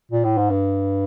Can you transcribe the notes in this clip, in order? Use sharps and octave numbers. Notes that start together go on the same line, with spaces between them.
A#2
A2
G#2
G2